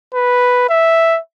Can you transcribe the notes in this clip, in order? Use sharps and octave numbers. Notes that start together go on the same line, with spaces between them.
B4
E5